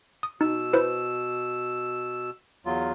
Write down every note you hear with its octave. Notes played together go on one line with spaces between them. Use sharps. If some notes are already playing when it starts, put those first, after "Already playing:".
D#6
B2 D#4 E6
E4 B4 C5
E2 F#3 F4